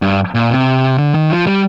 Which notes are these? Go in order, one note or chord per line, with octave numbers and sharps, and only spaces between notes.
G2
A#2
C3
D3
D#3
F3
G3